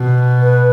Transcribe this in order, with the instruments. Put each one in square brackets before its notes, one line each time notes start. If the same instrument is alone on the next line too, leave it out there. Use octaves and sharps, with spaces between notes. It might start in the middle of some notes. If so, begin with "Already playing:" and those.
Already playing: [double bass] B2
[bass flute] B4